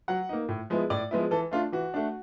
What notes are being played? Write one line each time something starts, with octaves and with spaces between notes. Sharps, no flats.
F#3 F#5
A#3 D#4
A2
F3 G#3 B3 E4
A2 D5
F3 G#3 B3 E4
E3 A4
A3 D4 F4
E3 F#4
A3 D4